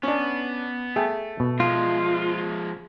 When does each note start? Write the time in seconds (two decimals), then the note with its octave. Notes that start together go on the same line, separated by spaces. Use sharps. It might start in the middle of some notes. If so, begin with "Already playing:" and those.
0.03 B3 C#4 D4
0.96 A3 G#4 G5
1.40 B2
1.60 F3 G#3 F4